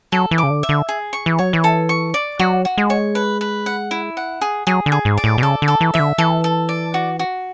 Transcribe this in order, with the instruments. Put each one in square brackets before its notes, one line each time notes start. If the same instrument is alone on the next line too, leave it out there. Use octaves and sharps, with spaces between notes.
[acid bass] F#3 [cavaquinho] A4
[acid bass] E3
[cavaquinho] D6
[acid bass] C#3
D3
[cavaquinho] E5
[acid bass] D3
[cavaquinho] G#4
C#6
[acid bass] E3
[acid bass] F#3 [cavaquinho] C#5
[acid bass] E3
[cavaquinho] A4
C#6
D5
[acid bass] F#3 [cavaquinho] F#4
[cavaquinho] F#4
[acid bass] G#3
[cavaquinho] C#5
B4
B4
F#5
E4
F#5
G#4
[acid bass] F#3 [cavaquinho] G#4
[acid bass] D3
[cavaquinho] G#4
[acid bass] G#2
[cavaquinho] D5
[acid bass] A2
B2
[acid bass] C#3 [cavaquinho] A4
[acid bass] D3
[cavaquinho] A4
[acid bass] E3
[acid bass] E3 [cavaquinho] E5
[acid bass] D3
[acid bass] E3 [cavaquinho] A4
[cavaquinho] A4
D5
F#4
F#4